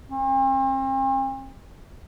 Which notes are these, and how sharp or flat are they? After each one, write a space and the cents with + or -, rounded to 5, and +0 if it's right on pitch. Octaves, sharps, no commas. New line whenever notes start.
C4 +40